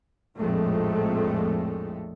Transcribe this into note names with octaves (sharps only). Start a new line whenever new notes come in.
A#1 F2 A2 F3 G#3 A3